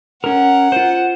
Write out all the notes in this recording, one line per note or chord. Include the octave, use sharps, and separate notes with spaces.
C#4 A#4 F#5
F4 C5